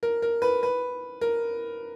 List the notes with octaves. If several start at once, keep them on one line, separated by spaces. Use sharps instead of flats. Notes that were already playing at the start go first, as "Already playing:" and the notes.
A#4
A#4
B4
B4
A#4